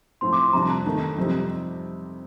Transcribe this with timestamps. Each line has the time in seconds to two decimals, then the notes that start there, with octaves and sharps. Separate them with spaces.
0.21 A2 F3 C4 C6
0.33 D6
0.43 C6
0.53 F2 C3 G3 D4 A#5
0.86 D#3 A3 D4
1.17 F2 C3 G3 C4 D#4